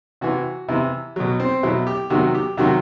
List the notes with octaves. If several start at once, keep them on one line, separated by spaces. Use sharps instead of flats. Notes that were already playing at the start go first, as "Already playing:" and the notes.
C3 E3 F#4
C3 E3 E4
B2 F#3
C4
B2 F#3 E4
G4
C3 D#3 F#3 F#4
G4
C3 D#3 F#3 F#4